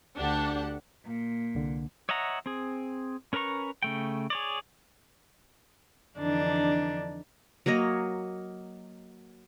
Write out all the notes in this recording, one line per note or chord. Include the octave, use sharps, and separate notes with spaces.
D2 D4 G4 A4 F#5
A#2
C2 D3
C#5 D#5 E5 F#5 A#5
C4 G#4
C#4 A#4 B4 A#5 C#6
C#3 A3 G5
G#4 C#5 D5
F2 D3 E3 D4 D#4 D5
F#3 A#3 C#5 D#5